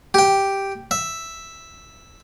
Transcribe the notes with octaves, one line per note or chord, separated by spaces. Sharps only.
G4 G5
E5